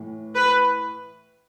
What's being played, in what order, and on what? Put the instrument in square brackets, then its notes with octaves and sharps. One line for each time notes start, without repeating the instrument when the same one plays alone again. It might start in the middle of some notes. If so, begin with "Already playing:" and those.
Already playing: [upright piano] A2 E3 A3
[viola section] B4